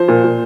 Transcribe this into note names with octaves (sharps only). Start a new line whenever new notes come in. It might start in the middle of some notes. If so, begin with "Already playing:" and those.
Already playing: F3 C5
A#2
A#2